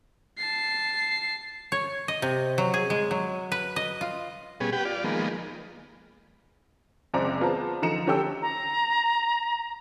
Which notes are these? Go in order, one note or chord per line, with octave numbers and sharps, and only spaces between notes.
A5 C7
C#5
D#5
C3
F#3
G#4
G#3
F#3
B4
D#5
F4
B2 G3 B3 C#4 G#4
G4 B4 F#5 G5
F4 D5
D#3 F3 G#3 A#3 B3
F#1 C#2 C4 C5 D5 A#5
B3 F4 G#4 C5 A5 A#5
D3 F3 D#4 A#5 C#7 E7
D3 C#4 G4 A4 G5 E6
A#5